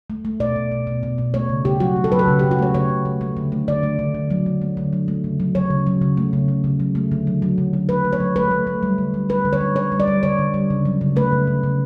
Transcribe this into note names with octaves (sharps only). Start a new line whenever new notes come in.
A3
A3
B2 D5
B2
B2
B2
B2
B2
A3 C#5
C#3
C#3 G4
F#3 F#4
A3
A4
F#3 B4
A4
C#3
G4
C#3
F#4
A3 C#5
C#3 C#5
C#3
A3
A3
D3
A3
D3 D5
A3
D3
D3
F#3
D3
A3
D3
F#3
A3
C#3
F#3
F#3 C#5
C#3
F#3
C#3
A3
C#3
A3
C#3
F#3
A3
D3
F#3
F#3
D3
F#3
A3 B4
A3
C#5
F#3
A3 B4
A3
A3
G3
D3
G3
G3 B4
D3
C#5
G3
G3 C#5
G3
D5
G3
D3 C#5
D3
G3
C#3
F#3
C#3
A3 B4
C#3
C#3
C#3